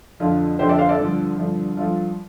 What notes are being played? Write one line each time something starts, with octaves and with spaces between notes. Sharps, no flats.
F2 D3 F3 F4
F2 D3 F3 G4 C5
A4 D5
C5 F5
A4 D5
G2 D3 F3
G2 D3 F3
G2 F3 F4 A4